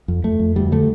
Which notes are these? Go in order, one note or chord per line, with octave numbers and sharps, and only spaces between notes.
F2
F2 A3
F2
D2 G3
D3 A3